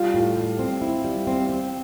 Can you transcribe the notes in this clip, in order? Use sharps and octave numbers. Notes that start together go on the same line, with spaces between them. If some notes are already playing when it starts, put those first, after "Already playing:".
Already playing: G3 F4
A2
G3
C4
E4
G3
C4
C4